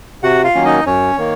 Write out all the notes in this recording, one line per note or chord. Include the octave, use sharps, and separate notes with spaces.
C3 F#4 F#5
F4 F5
D#3 F#3 A#3 C#4
D#4 D#5
F#2 C#4 C#5
D#3 A#3